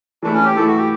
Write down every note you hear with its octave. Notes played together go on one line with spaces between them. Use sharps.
E3 A3 D4 E4
C#4
G4
E3 A3 E4 A4
F#4
G4